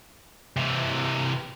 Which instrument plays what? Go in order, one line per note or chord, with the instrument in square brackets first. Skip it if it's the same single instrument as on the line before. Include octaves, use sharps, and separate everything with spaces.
[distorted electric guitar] C3 E3